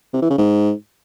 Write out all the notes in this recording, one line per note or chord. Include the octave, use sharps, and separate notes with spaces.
C3
E3
C#3
G#2